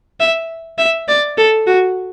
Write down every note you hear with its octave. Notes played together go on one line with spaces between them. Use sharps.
E5
E5
D5
A4
F#4